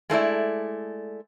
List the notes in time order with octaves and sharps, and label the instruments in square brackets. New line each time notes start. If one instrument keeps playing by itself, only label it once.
[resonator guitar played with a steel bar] G#3 A3 E4 D5